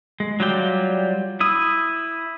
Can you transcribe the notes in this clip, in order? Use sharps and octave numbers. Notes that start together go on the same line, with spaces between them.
G#3
F#3 G3 F4 D5 G5
E4 D#6